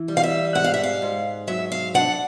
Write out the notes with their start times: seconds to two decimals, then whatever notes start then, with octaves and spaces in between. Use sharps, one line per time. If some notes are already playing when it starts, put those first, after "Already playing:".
Already playing: E3
0.08 G3
0.17 F5
0.23 E5
0.55 G#2 F#5
0.64 F5
0.74 E5
0.84 F5
1.02 G#2
1.47 F#3 E5
1.72 F5
1.94 D4 F#5